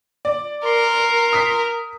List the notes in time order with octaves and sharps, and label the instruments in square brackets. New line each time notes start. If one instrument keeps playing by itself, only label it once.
[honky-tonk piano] D5
[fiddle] A#4 [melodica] C6
[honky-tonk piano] D#6 B6